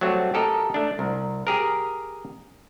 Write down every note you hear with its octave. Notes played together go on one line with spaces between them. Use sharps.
F#3 G3 A3 C4 F#4
G4 A4 A#4 D#5
A3 D4
C2
G4 G#4 A#4